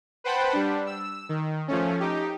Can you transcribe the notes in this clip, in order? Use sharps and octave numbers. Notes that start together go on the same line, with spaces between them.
B4 C5 F#5 G5 A5 B5
G3 D4
E6
D#3
F3 A3 C#4
D#4 G4